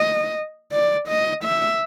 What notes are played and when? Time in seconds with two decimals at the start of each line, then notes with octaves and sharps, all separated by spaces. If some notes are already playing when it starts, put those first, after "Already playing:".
Already playing: D#5
0.73 D5
1.09 D#5
1.44 E5